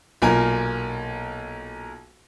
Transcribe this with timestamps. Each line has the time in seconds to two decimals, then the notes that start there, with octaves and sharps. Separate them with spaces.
0.22 B1 A#2 A#4 G#5